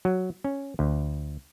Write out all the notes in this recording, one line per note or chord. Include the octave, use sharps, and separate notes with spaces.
F#3
C#4
D2